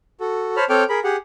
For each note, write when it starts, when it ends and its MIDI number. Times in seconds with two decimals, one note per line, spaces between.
0.20 0.56 66
0.20 0.56 69
0.57 0.65 72
0.57 0.65 73
0.57 0.65 81
0.57 0.65 83
0.57 0.65 89
0.69 0.84 60
0.69 0.84 69
0.69 0.84 73
0.69 0.84 79
0.69 0.84 86
0.69 0.84 89
0.89 1.00 68
0.89 1.00 70
0.89 1.00 83
1.04 1.17 67
1.04 1.17 68
1.04 1.17 78